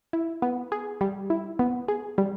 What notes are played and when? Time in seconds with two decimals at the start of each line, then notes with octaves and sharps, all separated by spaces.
0.13 E4
0.42 B3
0.72 G#4
1.01 G3
1.30 E4
1.59 B3
1.88 G#4
2.18 G3